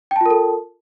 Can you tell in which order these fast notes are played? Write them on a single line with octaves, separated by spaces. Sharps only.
G5 A5 F4 A#4 A4